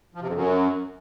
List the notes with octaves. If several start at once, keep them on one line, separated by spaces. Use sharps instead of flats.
F3
C3
F2
F#2